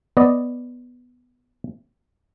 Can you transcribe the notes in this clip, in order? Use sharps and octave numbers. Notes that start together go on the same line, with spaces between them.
B3 D5 D#5